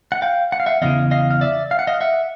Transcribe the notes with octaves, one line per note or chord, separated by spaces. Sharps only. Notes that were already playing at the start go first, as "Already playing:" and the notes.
F#5
F5 G5
F#5
F5
E5 F#5
E2 C#3 E3 D#5 F5
D#5 F5
F5
D5 E5
F5
F#5
D#5 F5
E5 F#5